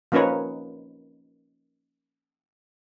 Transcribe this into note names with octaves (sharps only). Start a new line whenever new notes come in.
F3 A#3 C#4 D#4 B4 C#5